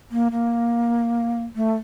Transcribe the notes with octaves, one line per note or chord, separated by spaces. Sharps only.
A#3
A#3
A3